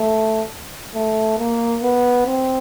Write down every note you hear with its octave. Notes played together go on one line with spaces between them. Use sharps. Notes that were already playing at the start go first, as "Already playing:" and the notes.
Already playing: A3
A3
A#3
B3
C4